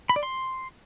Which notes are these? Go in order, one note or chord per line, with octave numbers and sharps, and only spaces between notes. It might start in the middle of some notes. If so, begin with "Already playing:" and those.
B5
D5
C6